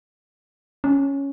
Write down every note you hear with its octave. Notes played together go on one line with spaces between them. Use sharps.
C#4